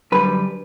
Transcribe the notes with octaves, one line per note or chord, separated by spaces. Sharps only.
F#2 D3 G3 B4